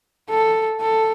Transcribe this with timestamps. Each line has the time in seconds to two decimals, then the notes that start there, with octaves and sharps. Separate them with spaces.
0.29 A4
0.81 A4